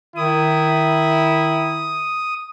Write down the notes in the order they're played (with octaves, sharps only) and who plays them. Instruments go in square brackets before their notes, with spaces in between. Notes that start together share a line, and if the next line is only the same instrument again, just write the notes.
[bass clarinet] D#3 [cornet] E4 [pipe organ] D#6